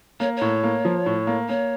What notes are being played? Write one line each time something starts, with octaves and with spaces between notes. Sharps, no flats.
A#3 C#5
A2 C#5
A#3
F3
A2
A#3
A#3 C#5